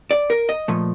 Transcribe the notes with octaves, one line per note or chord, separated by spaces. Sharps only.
D5
A#4
D#5
A#2 F3 A3